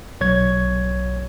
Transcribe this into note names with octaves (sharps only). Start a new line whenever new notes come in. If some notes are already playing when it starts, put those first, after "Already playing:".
B1 C#5 G#6